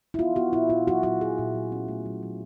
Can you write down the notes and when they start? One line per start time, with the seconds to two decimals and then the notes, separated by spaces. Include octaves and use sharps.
0.14 E4
0.19 B3 F4
0.36 B3 F#4
0.53 A#2 E4
0.69 A#2 F4
0.88 F#3 F#4
1.03 A#2 F#4
1.20 F#3 G#4
1.38 A#2
1.55 F#3
1.72 C#4
1.88 A3
2.06 F#3
2.23 F#3